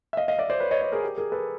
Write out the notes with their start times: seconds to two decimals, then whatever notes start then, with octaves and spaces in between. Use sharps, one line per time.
0.13 E5
0.17 D#5 F5
0.28 D#5 F5
0.38 D5 E5
0.50 C5 D5
0.60 B4 C#5
0.71 C#5 D#5
0.82 C#5 D#5
0.92 G#4 A#4
1.03 G4
1.18 G#4 A#4
1.32 A4 B4